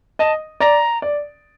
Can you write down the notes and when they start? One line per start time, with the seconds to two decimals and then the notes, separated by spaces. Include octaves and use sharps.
0.19 D#5 A5
0.60 D5 A#5
1.02 D5